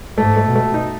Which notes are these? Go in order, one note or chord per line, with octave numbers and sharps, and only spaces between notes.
G#2 A3
A3
B2
A3
D#4